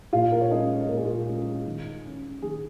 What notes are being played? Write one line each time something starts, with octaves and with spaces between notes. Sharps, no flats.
A#2 F4 F5
A#4
C#5
G#3 C#4 D#4 D#5
A#2 A#4
G#4
F4
G#4
G#3 C#4
D#3
C#4
D#3 G#4